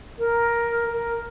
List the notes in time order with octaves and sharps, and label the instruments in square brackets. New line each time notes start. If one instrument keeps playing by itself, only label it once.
[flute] A#4
A#4